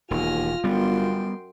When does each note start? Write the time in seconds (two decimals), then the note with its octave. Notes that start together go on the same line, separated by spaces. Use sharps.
0.11 E1 D#2 F4 G#5 F6 A#6
0.64 G1 F#2 G3 B3 G5 C6